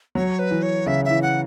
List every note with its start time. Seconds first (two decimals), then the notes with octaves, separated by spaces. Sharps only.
0.15 F#3 C#5
0.39 B4
0.51 E3
0.63 C#5
0.86 C#3 E5
1.05 E5
1.10 E3
1.22 F#5